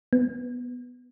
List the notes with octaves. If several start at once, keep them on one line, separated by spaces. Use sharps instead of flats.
B3